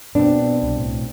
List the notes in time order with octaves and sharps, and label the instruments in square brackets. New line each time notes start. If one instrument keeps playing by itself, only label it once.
[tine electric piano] B2 C4 [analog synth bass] B3 [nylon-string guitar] D4
[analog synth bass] C2
A2